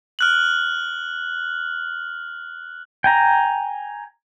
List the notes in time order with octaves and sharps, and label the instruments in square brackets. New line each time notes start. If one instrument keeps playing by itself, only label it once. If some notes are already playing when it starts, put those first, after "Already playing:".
[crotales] F6 F#6 F#7
[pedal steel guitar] G5 G#5 A#5